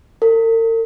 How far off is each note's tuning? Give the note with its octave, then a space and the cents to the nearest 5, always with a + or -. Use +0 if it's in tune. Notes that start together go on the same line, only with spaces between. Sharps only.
A#4 -45